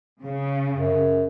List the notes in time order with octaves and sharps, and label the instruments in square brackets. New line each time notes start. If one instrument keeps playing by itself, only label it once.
[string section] C#3
[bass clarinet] F#2